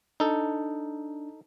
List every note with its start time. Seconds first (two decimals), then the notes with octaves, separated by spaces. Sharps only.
0.20 D4 D#4 A4